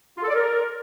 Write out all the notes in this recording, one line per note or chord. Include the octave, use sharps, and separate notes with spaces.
F4
A4
D5
A#4